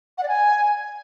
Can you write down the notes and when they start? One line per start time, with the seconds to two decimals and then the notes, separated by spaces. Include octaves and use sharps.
0.18 F#5
0.23 D5
0.28 G#5